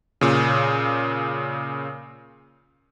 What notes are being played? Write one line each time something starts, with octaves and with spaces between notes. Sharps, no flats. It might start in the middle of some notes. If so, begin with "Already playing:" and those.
A#2 C#3